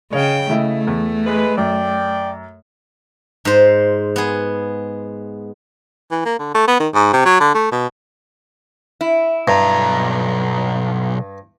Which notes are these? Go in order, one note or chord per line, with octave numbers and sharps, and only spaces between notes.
C#3 C#5 D#5 F5 G5
C#3 A3 E4 D#5
E2
G#3 B4
F#2 D5 G5
G#2 C5
B3 G#4
E3
A#3
D3
A3
B3
D#3
G#2
C3
F#3
D3
A3
B2
E4
B1 G2 A#5